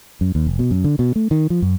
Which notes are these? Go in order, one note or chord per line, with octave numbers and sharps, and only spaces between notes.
F#2
D#2
F1
B2
F#2
D3
B2
A3
D#3
F3
F#2